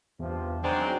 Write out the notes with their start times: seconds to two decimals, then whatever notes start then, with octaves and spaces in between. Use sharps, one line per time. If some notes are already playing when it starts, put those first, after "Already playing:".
0.19 E2 G2 C3 F3
0.64 D#3 F#3 G#3 C4 D4 G5 G#5 A#5